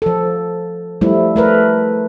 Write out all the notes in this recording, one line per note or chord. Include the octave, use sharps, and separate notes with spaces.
F3 A4
F3 G3 A3 E4
A3 A#4 B4